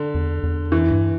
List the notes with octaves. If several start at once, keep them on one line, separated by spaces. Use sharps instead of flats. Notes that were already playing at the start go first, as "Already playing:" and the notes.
Already playing: D3
E2
E2
F2 E3
G2